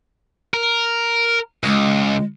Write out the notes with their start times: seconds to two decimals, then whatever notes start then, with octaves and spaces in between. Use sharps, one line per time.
0.54 A#4
1.64 C#2 G#3